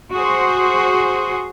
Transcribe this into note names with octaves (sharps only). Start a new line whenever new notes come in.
F#4 G#4 C5